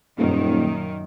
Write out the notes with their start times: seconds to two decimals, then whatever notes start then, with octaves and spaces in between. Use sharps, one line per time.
0.19 D#1 F#2 A#2 D#3